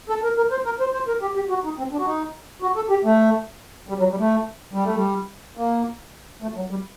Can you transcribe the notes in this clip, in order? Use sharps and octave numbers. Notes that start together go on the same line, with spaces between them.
A4
A#4
A#4
C5
A#4
C5
C5
A#4
G4
G4
F#4
D#4
C4
D4
F#4
D#4
F#4
A4
G4
A3
G3
F#3
G3
A3
G3
A3
G3
A#3
A3
F#3
G3